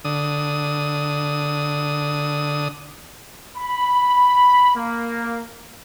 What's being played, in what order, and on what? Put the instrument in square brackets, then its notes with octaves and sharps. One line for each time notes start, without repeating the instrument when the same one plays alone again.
[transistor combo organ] D3 D#6
[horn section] B5
A#3